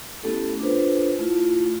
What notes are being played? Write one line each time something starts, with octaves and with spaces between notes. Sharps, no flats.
A3 B3 C#4 E4 G4 A4
D4 F4 A4 B4 C5
A3 E4 F4